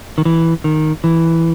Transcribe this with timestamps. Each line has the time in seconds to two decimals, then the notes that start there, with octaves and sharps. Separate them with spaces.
0.18 D#3
0.25 E3
0.64 D#3
1.04 E3